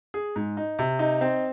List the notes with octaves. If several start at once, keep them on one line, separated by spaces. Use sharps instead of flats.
G#4
G#2
D#4
C3
D#4
C4